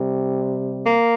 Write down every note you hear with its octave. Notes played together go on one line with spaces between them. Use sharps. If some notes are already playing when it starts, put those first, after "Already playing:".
Already playing: C3 G3
A#3